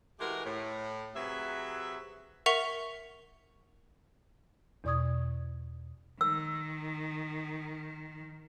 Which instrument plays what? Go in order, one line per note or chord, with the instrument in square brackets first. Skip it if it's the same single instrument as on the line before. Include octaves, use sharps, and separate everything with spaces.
[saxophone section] E3 G#3 A3 F#4 G4 A#4
A2
C3 F#3 G#4 B4 E5
[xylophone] A#4 E5 F#5 C#6 B6 F7
[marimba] E2 B2 D5 C#6 D#6 G#6
[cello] D#3 [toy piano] E6